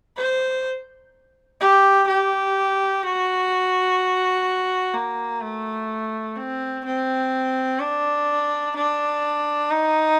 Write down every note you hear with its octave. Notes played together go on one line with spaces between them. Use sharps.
C5
G4
G4
F#4
A#3
A3
C4
C4
D4
D4
D#4